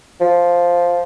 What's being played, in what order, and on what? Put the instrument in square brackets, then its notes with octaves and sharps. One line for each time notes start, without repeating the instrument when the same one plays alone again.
[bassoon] F3